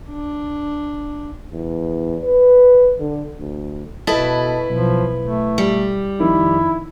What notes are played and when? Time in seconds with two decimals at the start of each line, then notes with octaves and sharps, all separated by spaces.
0.10 D4
1.51 E2
2.24 B4
3.00 D3
3.39 D2
4.07 B2 E4 A4 B4 D#5 A5
4.70 B1 F3
5.22 A3
5.58 G3
6.20 F2 D#3 E4